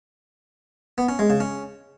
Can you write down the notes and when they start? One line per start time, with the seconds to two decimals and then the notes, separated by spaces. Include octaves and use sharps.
0.98 B3
1.09 C#4
1.19 G#3
1.30 C#3
1.40 C#4